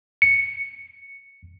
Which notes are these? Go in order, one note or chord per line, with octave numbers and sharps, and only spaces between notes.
C#7